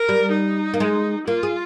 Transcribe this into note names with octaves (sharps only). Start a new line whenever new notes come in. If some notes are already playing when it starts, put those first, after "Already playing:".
Already playing: A#4
G3
D#4
A#3
G#3
A#3 F4
G#4